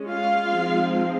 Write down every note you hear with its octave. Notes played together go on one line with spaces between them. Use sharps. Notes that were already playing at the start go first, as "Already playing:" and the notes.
Already playing: G#3 C#4
F4 F5
F3 G#3 C4 D#4